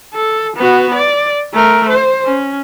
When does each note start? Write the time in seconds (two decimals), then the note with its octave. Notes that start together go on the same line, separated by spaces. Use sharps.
0.14 A4
0.56 B3 F#4
0.94 D5
1.53 A3 A#4
1.89 C5
2.25 C#4